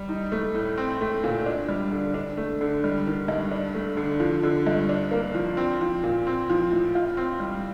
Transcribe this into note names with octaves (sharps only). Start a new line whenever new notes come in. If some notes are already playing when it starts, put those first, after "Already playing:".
Already playing: G3
D#4
A3
A2
C4
A3
A#2
D4
G3
D3
D4
A3
D3
G3
D#3
G2
D4
A3
D3
F3
D3
G2
D4
A#3
F3
C4
F3
A#2
C4
F3
A2
F4
C4
G3